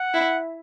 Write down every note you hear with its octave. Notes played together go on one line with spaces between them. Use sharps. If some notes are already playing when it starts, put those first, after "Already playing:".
Already playing: F#5
E4